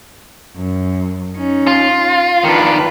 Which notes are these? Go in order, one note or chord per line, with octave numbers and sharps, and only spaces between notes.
F#2
C#4 D#4
F4
D#3 D4 F4 B4